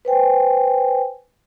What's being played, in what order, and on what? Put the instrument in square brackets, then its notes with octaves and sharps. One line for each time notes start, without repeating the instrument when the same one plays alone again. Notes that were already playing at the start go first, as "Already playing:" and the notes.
[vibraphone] B4 C5 G5 G#5